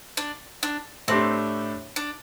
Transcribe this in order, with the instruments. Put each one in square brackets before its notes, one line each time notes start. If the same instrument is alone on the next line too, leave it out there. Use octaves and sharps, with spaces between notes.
[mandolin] D4
D4
[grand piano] A2 A3 D4 G4 [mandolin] C4
[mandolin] D4